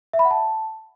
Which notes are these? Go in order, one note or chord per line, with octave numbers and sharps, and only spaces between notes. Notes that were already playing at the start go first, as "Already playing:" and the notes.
E5
B5
F#5
A5